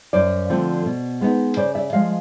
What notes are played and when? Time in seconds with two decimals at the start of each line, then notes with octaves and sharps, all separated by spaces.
0.13 F#2 C5 D5
0.50 D3 F3 A3 C4
0.85 B2
1.21 G#3 B3 D#4
1.56 C#3 C5 D5
1.75 D5 E5
1.93 F3 G#3 D#5 F5